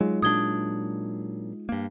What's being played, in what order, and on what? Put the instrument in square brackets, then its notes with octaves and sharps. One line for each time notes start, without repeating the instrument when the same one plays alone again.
[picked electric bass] F#3 [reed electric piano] G#3 D#4 F4
[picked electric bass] A#2 F#3 D4 [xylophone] D#6 G#6 G7
[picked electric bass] G2 A#3